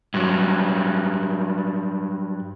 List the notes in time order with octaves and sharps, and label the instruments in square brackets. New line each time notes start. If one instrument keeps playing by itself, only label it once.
[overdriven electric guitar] G2 F#3